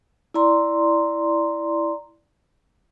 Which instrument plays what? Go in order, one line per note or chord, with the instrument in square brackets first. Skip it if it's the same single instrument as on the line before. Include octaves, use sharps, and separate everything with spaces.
[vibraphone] E4 D5 A#5 C6